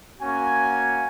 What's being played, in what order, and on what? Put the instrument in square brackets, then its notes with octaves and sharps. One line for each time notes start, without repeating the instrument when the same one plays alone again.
[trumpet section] A#3 C#4 F#4 G#5